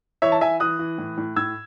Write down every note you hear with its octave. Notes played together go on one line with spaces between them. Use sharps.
E3 C#5 E5
A5
E3 E5 G#5
E3 D#6 F#6
E3
A2
A2
A2 E6 G#6